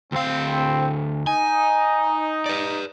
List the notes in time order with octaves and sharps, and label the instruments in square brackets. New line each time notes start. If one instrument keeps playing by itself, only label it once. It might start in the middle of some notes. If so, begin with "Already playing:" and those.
[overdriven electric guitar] D2 F5 [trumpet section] C4
[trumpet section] D#4 [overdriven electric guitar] G#5
[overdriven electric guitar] B4 D5